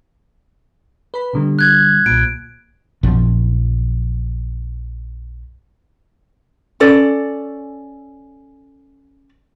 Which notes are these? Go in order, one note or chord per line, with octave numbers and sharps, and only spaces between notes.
B4 B5
B2 D3 G3
F#6 G#6
B1 A#2 D7
A#1 F#2 B2 F3
C#4 A4 D5